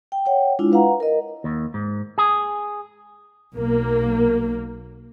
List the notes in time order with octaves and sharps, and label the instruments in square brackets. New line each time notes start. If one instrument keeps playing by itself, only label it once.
[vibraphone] G5
C#5 F#5 G5
G#3 D4 E4 F4
B4 F5 F#5 A#5
A#4 D#5
[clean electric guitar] D#2
G#2
G#4
[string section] B1 A#3